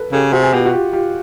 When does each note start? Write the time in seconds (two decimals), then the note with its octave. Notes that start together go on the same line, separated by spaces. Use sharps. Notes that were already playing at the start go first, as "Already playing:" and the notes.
Already playing: A4 B4
0.12 C#3 G4 A4
0.33 C3 F#4 G#4
0.43 G#4
0.52 B2 F4 G4
0.66 F#4
0.73 F4 G4
0.93 F4 G4